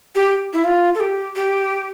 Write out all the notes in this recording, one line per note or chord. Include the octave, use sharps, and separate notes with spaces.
G4
E4
F4
A4
G4
G4